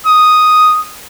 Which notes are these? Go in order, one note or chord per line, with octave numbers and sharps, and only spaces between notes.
D#6